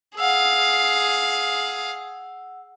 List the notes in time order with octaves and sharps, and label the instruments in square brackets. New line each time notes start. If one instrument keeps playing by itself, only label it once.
[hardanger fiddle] G#4 F5 [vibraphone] F#5 E6